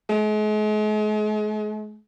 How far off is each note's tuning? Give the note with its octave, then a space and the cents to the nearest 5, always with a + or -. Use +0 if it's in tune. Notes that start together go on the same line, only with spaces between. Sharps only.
G#3 +40